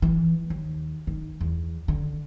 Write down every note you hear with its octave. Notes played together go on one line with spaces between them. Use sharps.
E3
D#2
D#3
E2
D3